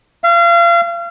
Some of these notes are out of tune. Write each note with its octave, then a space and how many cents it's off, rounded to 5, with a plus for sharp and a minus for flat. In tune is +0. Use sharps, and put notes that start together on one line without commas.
F5 -35